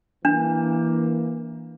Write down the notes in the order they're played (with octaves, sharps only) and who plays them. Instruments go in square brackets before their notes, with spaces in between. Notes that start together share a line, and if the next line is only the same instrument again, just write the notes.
[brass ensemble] E3 A#3 [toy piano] D4